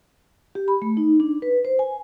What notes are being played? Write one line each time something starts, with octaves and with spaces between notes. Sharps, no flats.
G4
B5
A3
D#4
D4
B4
C5
G#5